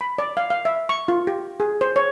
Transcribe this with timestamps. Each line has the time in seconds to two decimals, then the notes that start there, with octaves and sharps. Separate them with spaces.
0.01 B5
0.18 D5
0.37 F5
0.50 F5
0.65 E5
0.89 C#6
1.08 F4
1.27 G4
1.60 G#4
1.81 C5
1.96 C#5